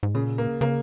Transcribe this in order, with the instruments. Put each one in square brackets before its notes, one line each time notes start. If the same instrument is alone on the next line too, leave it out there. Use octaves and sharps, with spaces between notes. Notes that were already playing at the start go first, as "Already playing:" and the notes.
[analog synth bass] G#2
[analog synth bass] A#2 [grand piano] C#3
[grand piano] A#3
[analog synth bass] C#3 [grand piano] A#3